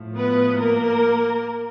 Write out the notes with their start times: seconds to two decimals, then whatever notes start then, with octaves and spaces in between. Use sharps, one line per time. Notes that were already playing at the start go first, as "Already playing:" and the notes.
Already playing: A2 F3
0.15 B3 B4
0.58 A#3 A#4